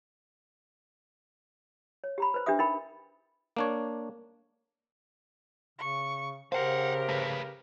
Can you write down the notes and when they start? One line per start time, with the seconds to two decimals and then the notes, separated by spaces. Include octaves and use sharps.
2.04 C#5
2.18 G4 A#5 B5
2.34 B4 C5
2.46 D4 G4 B4 E5 D#6
2.58 D4 D#4 A#4 G5 B5
3.57 A#3 D4 C#5
5.79 C#3 C#6
6.52 C#3 G4 A#4 C5 F5 F#5
7.09 A3 B4